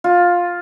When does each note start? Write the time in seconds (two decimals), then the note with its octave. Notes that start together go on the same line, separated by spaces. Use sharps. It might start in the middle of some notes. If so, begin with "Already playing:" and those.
0.04 F4